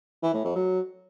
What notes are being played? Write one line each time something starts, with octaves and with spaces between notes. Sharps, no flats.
E3
A2
F2
F#3